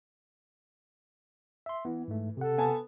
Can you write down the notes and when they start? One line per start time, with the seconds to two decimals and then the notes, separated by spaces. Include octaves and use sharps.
1.66 E5 C6
1.85 E3 B3
2.08 G#2 A3
2.37 C3 A4 F#5
2.58 B3 G#5 A5